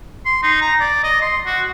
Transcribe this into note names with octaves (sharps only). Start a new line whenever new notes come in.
C6
D#4
A#5
D5
D#5
C6
F#4